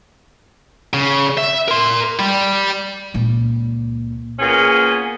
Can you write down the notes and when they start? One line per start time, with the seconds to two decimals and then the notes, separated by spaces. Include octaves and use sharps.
0.94 C#3
1.38 E5
1.68 A#4 C6
2.20 G3
3.14 C#2 A#2
4.39 A#2 B3 C#4 G#4